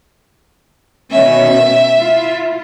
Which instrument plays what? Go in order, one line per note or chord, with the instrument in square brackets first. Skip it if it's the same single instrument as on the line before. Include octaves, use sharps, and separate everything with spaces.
[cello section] B2 D#3 C#4 [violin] E5
[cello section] E4 F4